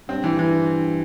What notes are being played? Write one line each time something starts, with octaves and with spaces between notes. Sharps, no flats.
G2 C4
E3
E3